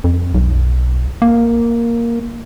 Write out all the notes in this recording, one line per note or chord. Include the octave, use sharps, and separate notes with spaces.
F2
B1
A#3